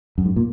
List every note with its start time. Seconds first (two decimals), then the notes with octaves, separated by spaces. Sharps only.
0.18 F#2
0.25 G#2
0.36 A#2